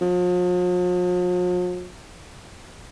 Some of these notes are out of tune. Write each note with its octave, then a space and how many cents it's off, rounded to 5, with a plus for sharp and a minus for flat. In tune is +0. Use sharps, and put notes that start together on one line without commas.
F3 +45